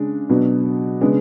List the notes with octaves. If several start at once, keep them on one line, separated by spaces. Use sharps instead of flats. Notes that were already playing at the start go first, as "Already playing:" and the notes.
Already playing: C#3 G#3 D4
B2 F#3 B3 D4
C#3 G#3 B3 D4